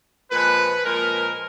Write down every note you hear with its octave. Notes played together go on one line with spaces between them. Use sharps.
A#2 F3 G#3 B4
A#2 F3 G#3 A#4